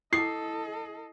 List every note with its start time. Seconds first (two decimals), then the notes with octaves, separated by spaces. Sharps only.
0.13 E4 A4 D#5 D6 D#6 C7